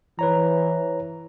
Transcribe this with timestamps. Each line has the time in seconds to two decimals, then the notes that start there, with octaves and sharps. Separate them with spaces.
0.19 E3 B4 C#5 A#5